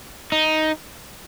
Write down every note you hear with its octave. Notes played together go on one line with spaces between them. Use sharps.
D#4